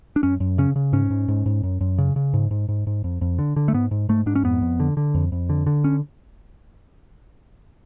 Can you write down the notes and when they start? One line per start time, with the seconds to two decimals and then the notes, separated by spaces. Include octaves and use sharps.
0.16 D4
0.23 F#2 C#4
0.40 F#2
0.58 C#3 C#4
0.76 C#3
0.93 G#2 C#4
1.10 G#2
1.28 G#2
1.46 G#2
1.63 F#2
1.81 F#2
1.98 C#3
2.16 C#3
2.34 G#2
2.51 G#2
2.69 G#2
2.87 G#2
3.04 F2
3.21 F2
3.39 D3
3.56 D3
3.68 A3
3.74 G#2 B3
3.91 G#2
4.09 G#2 A3
4.26 G#2 D4
4.35 C#4
4.44 F2 B3
4.62 F2
4.80 D3
4.97 D3
5.14 F2
5.32 F2
5.49 D3
5.66 D3
5.84 C#4